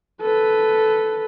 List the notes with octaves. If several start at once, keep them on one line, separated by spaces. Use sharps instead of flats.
A4 B4